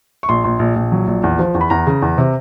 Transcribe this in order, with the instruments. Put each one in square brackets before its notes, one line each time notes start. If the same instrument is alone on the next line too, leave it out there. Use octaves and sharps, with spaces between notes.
[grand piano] C#6
A#1 C6
A#1 C6
A#1
A#1
F#3
A#1
E2
F3
E2
B5
E2 A#5
C#3
E2
C3